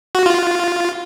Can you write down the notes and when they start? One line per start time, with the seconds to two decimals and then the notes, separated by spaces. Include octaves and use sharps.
0.15 F#4
0.26 F4